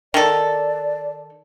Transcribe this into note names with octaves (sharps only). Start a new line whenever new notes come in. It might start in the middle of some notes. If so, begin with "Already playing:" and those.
D#3 A4 D5